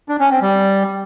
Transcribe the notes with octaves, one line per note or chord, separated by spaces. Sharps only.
D4
C#4
C4
G3